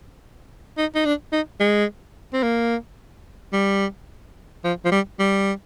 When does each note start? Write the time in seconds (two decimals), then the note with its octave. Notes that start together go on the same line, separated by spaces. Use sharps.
0.77 D#4
0.95 D#4
1.05 D4
1.32 D#4
1.60 G#3
2.33 C4
2.43 A#3
3.53 G3
4.64 F3
4.85 F3
4.92 G3
5.19 G3